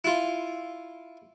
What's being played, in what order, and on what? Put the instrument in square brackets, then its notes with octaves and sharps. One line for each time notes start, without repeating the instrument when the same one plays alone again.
[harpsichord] E4 F4